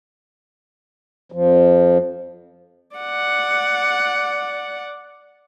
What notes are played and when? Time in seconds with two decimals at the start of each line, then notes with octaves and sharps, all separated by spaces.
1.32 F2 F3
2.96 D5 F#5